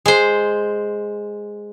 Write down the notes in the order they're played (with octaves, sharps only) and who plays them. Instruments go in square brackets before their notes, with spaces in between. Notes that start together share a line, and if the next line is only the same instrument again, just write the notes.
[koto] G#3 C5